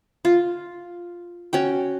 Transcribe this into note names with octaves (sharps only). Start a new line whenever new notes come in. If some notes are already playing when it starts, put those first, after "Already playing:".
F4
C#4 F#4 G5